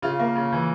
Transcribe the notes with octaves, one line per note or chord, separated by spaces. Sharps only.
C#3 F4
A#3
C#3
E3